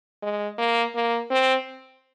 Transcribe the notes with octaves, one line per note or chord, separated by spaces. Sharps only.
G#3
A#3
A#3
C4